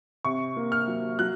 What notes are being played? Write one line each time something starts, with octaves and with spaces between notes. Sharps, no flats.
C3 C#6
A#3
F6
F#3
F#3 F#6